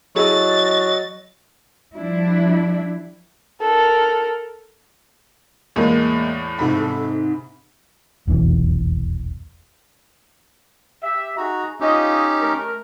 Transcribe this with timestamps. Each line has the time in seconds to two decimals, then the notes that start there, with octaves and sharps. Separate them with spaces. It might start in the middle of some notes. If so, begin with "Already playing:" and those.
0.16 F#3 E4 G#4 A4 D#5 A6
1.95 F3 G3 D4 E4
3.62 A4 A#4
5.76 E2 A2 G#3 A#3
6.59 G#2 C3 A4 B5
8.27 F1 B1 E2 E3
11.02 G4 E5
11.37 D#4 F#4 G#4 A#5
11.80 C#4 D#4 F4 G4 D#5
12.41 A3 A#4